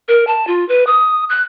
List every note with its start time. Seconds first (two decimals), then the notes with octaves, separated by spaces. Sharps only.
0.08 A#4
0.27 A5
0.47 F4
0.69 B4
0.87 D#6
1.30 F#6